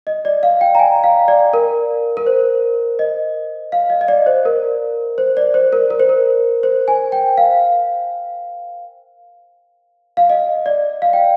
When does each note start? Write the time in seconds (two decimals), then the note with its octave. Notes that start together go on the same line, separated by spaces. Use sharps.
0.07 D#5
0.25 D5
0.43 F5
0.61 G5
0.75 A#5
0.79 G#5
1.04 F5
1.28 D5
1.53 A#4
2.17 A#4
2.26 C5
2.99 D#5
3.72 F5
3.90 D#5
4.01 D#5
4.08 D5
4.26 C5
4.45 A#4
5.18 C5
5.37 D5
5.54 C5
5.73 A#4
5.90 A#4
6.00 C5
6.09 A#4
6.63 C5
6.88 G#5
7.12 G5
7.38 F5
10.17 F5
10.30 D#5
10.66 D5
11.02 F5
11.13 G5